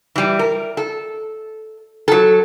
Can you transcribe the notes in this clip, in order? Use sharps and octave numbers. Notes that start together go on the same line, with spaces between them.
E3 G3
A#4
A4
F#3 A4